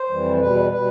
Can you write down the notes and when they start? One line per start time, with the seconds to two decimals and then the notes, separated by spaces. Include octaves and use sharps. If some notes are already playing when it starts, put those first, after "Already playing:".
Already playing: C5
0.10 F2 E3 G3
0.40 E2 B2 G3 B4
0.71 B2 G3 B4